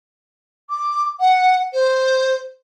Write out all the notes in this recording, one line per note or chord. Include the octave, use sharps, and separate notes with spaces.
D6
F#5
C5